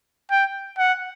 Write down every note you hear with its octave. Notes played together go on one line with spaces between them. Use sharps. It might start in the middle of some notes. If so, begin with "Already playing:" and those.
G5
F#5